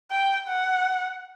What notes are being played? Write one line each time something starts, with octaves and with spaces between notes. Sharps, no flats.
G5
F#5